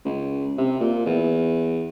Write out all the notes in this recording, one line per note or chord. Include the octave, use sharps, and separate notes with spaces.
C#2
C3
A#2
E2